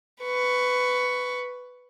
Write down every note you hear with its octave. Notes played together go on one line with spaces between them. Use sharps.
B4 C#6